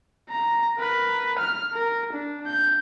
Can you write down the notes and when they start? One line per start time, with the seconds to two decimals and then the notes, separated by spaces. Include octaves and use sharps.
0.30 A#5
0.77 A#4 B4
1.38 F6
1.73 A#4
2.13 D4
2.46 G6